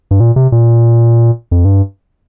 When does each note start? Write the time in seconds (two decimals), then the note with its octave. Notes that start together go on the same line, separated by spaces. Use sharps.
0.11 G2
0.20 A#2
0.36 C3
0.52 A#2
1.51 F2
1.65 G2